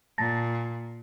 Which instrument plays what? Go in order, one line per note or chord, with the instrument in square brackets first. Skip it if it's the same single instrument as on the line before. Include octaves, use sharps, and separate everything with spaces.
[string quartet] A#2 [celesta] A5 A6 A#6